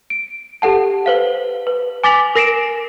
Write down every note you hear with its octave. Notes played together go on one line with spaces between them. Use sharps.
D7
G4 A4 F#5 A5
B4 C5 F5
B4
G#5 D6 A6 B6 F7 F#7
A#4 A#6 C7 D7 E7